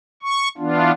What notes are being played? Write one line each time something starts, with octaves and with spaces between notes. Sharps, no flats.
C#6
E3 B3 D4 F4